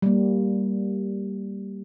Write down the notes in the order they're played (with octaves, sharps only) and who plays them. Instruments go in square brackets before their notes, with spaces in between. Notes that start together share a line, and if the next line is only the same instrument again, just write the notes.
[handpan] G3 A#3